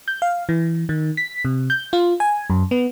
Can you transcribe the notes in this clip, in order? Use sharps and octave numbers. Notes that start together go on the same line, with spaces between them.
G6
F5
E3
D#3
B6
C3
G6
F4
G#5
F#2
B3